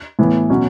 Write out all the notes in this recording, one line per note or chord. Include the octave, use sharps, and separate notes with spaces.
A2 E3 B3
B2 F#3 C#4 F#4